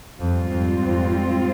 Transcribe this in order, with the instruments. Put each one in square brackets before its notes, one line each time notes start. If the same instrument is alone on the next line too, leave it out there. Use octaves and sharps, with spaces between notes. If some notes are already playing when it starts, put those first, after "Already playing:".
[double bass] F2 [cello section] G#2 G3 C4 F4
[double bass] F2
F2